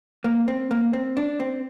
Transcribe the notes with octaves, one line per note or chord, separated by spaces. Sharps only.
A#3
C4
A#3
C4
D4
C4